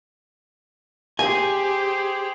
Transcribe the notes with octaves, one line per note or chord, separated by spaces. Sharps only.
G4 G#4 C5 G#5